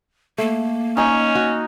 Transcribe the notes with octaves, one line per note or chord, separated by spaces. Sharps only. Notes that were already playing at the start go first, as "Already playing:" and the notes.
A3 A#3
C#4 D#4 G#5 C#6
F#4